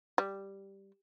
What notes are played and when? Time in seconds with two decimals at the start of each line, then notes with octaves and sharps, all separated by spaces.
0.18 G3